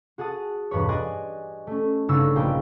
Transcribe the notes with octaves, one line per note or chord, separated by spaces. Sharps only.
F#4 G#4 F#5 A5 D#6
E1 G2 B4 C#5
D5 D#5 G#5 C6 D#6 F#6
A3 C#4
G1 C#3 D4 D#4 C#5 E6
A#1 A#3 D#5 G5 D#6